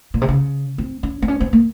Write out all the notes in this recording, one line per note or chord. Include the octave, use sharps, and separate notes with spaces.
A#2
C3
C#3
C4
C#4
C4
C#4
C4
A#3